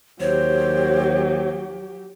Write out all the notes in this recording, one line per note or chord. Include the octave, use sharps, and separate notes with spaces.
D#2 F#3 G4 C5 C#5